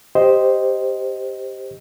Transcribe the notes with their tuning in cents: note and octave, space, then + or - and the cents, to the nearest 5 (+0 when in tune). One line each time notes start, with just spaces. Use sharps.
G4 +0 C5 +0 D#5 +0